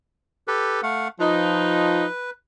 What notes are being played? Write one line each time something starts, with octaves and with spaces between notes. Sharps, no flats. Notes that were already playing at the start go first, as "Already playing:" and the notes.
G4 A4 B4
A3 F5 F#5
F3 D#4 B4